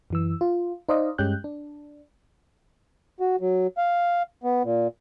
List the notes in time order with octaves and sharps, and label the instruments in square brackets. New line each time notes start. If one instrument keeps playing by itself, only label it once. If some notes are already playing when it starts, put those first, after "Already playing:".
[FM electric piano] F#2 E3 E6
F4
D#4 C5 D5 D#5 F5
G2 G#3 C#4 G4 F#6 G6
D4
[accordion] F#4
F#3
F5
B3
A#2